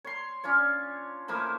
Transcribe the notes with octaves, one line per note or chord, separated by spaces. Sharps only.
C#5 C6
C#4 D4 F4 C#5
F3 A3 A#3 E4